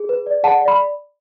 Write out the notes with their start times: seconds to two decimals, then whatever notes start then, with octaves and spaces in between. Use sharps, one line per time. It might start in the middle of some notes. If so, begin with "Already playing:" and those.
Already playing: G#4
0.09 B4
0.26 D5
0.43 G#4 F#5 A5
0.61 D5
0.68 B5